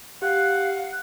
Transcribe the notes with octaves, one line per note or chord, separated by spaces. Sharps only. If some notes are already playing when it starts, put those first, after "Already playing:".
G4 F5 F#5